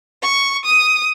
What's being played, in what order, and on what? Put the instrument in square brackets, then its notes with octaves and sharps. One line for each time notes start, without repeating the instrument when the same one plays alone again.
[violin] C#6
D#6